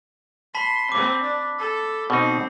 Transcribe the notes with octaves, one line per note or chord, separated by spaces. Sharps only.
A5 B5 C6 B6
C4 D6
D4
A4
B2 C4 D#4